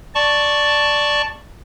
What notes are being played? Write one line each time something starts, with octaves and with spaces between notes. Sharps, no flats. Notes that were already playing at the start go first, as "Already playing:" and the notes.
D5 A5 C#6